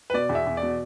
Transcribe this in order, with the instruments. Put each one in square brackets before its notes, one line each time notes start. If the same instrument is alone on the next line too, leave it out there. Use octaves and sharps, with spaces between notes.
[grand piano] B4
[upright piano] B2 [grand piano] D5
[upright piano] E2
[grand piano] E5
[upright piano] E2
[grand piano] D5
[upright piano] B2